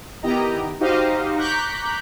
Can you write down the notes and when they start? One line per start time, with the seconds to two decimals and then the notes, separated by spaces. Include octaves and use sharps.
0.23 D#3 B3 E4 G4 D#5 A#5
0.80 D#4 F#4 G4 C5 D#5 F5
1.36 A#5 C#6 D6 F#6 G6 B6